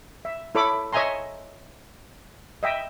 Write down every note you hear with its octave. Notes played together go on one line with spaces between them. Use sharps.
E5
E4 A4 C#5 B5 D6
C#5 D#5 E5 G#5 A#5 C6
D#5 E5 G5